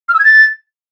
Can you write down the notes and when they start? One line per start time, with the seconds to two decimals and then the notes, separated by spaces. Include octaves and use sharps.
0.09 F6
0.14 E6
0.19 G#6
0.25 A6